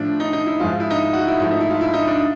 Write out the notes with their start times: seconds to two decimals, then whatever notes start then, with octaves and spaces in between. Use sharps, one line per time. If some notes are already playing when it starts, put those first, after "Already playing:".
Already playing: A2 F3 A3 D4
0.20 D#4
0.33 D#4
0.46 E4
0.60 G#2 F3 G#3 F4
0.80 E4
0.90 D#4
1.13 F#4
1.27 E4
1.40 G#2 F3 A3 E4
1.51 D#4
1.60 E4
1.70 F4
1.81 E4
1.93 D#4
2.07 D4